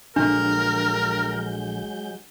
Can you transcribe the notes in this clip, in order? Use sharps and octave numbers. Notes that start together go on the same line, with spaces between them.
A#1 D3 F#3 G#3 D4 A#4 G6